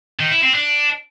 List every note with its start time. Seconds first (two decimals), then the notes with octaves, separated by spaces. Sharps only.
0.20 D#3
0.31 E4
0.43 C4
0.55 D4